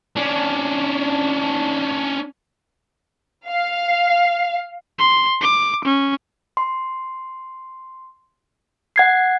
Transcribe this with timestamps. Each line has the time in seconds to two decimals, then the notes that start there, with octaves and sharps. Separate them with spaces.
0.16 C#4 D4
3.48 F5
4.99 C6
5.42 D6
5.85 C#4
6.57 C6
8.96 F#5 G#6 C7